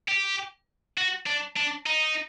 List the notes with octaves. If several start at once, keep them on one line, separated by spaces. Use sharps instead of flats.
G4
F#4
D4
D4
D#4